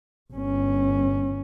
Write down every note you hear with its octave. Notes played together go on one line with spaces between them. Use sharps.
G1 C#4